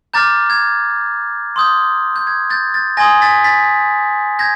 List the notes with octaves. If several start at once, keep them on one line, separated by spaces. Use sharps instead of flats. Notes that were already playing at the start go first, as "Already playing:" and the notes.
A#5 D6 F6 G6 A6
G#6
C6 D#6 G6
G6
G#6
G6 A6
G6 A6
G#5 C6 D#6 G#6 A#6
A6 B6
A6 B6
G6 G#6 A#6